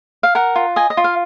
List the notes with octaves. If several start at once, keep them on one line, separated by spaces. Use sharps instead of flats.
F5
A#4 F#5
F4
D#5 G#5
D#5
F4
F5